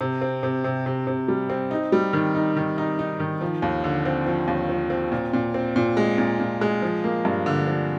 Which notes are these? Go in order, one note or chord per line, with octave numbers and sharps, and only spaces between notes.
C3
C4
C3
C3
C3
C3
G3
C4
D#4
G3
D#3
D#4
D#3
D#4
D#4
D#3
F3
D#2
D3
C4
F3
D#2
F3
C4
A#2
A#2
C4
A#2
G#3
A#2
A#2
G#3
F3
A#3
G2
D3
F3